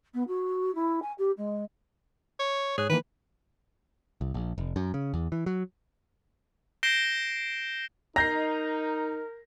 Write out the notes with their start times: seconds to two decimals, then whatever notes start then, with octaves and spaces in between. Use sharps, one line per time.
0.14 B3
0.27 F#4
0.75 E4
1.02 G#5
1.18 G4
1.37 G#3
2.39 C#5
2.78 G#2 G#4 C#5 F#6
2.89 D#3 E3 A#3 B4
4.21 C2
4.34 A#1
4.58 F1
4.76 F#2
4.94 C#3
5.14 E2
5.32 E3
5.46 F#3
6.83 G6 A#6 C7 D7 E7 G7
8.16 D#4 A#4 A#5 G6 A#6 C7